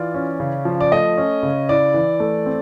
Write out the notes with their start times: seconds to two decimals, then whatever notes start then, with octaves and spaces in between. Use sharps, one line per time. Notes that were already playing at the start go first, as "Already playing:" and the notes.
Already playing: E3 F4 D5
0.14 C#4
0.40 C#3
0.65 F3
0.81 D5
0.91 A3 D#5
1.17 C#4
1.43 C#3
1.69 E4 D5
1.94 E3
2.20 A3
2.46 C4